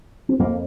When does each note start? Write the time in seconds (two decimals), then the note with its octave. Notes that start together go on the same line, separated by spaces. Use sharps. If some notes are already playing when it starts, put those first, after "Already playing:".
0.29 C4
0.39 F2 A#3